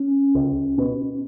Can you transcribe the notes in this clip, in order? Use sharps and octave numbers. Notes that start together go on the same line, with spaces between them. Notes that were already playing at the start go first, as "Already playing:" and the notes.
Already playing: C#4
C#2
B2